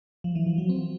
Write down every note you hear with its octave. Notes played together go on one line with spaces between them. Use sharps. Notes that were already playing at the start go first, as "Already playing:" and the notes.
F3
E3
F3
F#3
C4